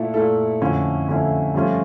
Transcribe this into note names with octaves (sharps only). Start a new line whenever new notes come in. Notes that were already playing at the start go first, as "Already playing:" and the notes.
Already playing: A#2 A3 E4 A4
A#2 A3 E4 A4
F2 D3 A3 C#4 E4
F2 D3 A3 C#4 E4
G2 F3 A3 C#4 F4